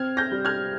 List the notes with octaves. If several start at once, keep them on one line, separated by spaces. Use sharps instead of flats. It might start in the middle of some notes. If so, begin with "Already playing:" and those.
Already playing: C4 F6 G#6
G6 A#6
G3
F6 G#6